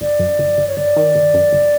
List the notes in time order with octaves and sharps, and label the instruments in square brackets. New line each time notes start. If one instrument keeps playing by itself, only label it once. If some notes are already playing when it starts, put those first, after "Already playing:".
[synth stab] G1 [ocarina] D5
[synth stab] F#2
G1
G1
[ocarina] C#5
[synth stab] G1 [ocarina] D5
[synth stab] D#3
G1
F#2
G1